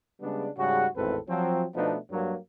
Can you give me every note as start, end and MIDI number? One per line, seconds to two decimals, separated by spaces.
0.21 0.49 49
0.21 0.49 55
0.21 0.49 56
0.21 0.49 59
0.21 0.49 62
0.58 0.87 44
0.58 0.87 49
0.58 0.87 55
0.58 0.87 66
0.96 1.19 32
0.96 1.19 40
0.96 1.19 45
0.96 1.19 60
0.96 1.19 69
0.96 1.19 71
1.29 1.65 53
1.29 1.65 54
1.29 1.65 60
1.75 1.97 47
1.75 1.97 53
1.75 1.97 57
1.75 1.97 59
1.75 1.97 62
1.75 1.97 63
2.11 2.35 43
2.11 2.35 54
2.11 2.35 58